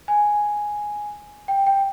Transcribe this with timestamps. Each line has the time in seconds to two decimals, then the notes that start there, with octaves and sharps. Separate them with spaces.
0.08 G#5
1.48 G5
1.67 G5